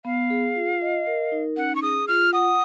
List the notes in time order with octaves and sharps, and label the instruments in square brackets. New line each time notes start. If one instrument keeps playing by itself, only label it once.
[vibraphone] B3 [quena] F5
[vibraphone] G#4
F4
D#5
A#4
D#4
[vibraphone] C#4 [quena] F#5
[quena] C#6
[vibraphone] G#4 [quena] D#6
[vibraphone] F4 [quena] F6
[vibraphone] F#5 [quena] D#6